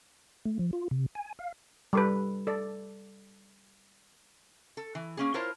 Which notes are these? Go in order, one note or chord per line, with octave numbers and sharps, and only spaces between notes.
A3
F3
F4
C3
G#5
F5
G3 A4 B4
A4 D5
A4
E3
A#3 C#4 G#4
E4 F4 A#4 C5 C#5 A5